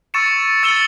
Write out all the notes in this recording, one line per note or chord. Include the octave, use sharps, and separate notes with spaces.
C#6 E6 A6 C#7 E7
E6 A6 C#7 E7 G7